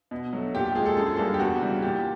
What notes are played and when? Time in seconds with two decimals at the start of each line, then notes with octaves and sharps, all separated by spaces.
0.11 B2
0.33 F#3 A3
0.55 A#2 G4
0.65 G4
0.75 F3 G#3 G#4
0.86 A4
0.97 F#2 A4
1.06 G#4
1.16 D3 G3 A#3 A4
1.34 G4
1.39 E2 F#4
1.61 C#3 E3 G3
1.82 A#2 G4